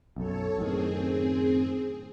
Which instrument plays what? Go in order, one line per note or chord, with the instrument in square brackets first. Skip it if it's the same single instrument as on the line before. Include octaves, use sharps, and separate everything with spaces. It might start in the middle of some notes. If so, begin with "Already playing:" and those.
[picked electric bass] B1 F#2 [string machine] A4 C#5
[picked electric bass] F#2 A2 D#3 [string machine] C4 G#4